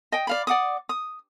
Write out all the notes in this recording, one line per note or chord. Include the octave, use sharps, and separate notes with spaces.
D#5 G5
D5 F5 B5
D5 F#5 D6 D#6
D#6